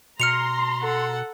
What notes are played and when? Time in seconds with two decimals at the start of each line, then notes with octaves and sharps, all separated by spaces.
0.20 B2 A#5 C6 F6 C#7 F7
0.82 A4 F#5